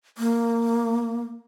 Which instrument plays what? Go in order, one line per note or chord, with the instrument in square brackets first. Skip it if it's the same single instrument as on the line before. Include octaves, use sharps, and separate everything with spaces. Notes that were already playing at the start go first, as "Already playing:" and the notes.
[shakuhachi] A#3